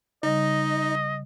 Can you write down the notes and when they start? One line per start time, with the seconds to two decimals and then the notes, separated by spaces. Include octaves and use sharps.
0.23 C#3 G3 D#4 D#5